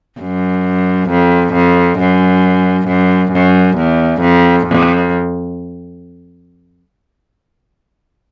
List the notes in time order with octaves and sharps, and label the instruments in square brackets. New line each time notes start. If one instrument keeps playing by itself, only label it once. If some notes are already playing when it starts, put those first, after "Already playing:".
[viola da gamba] F#2
F2
F2
F#2
F#2
F#2
E2
F2
F2